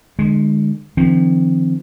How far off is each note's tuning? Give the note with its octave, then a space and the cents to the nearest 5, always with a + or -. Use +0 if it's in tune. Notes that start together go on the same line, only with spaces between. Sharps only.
D3 +40 G#3 +0
D3 +45 F3 -35 C4 +0